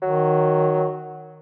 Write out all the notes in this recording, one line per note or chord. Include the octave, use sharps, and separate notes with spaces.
D#3 F#3